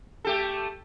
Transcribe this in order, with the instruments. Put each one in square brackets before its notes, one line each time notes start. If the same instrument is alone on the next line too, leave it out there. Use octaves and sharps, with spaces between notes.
[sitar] A3 G4 A4